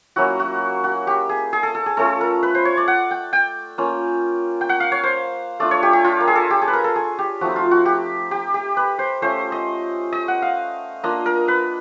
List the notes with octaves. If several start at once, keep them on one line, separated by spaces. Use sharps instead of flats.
F#3 A#3 C#4 E4 F#4
F#4
F#4
G4
G#4
G#4
A4
A4
G#4
A3 C#4 F4 A4
A#4
B4
C5
C#5
D5
F#5
G5
G5
A#3 C#4 F4
G5
F#5
F5
C#5
C5
A3 D4 F4 D5
C#5
G4
G4
F4
A#4
G#4
A4
G4
G#4
B4
A#4
A4
G#4
G4
F3 A3 C4 D#4 F#4
F4
F#4
G4
G4
G4
B4
C5
A3 C#4 F4 C5
D#5
D#5
F#5
F5
A#3 D4 F4 D#5
A#4
B4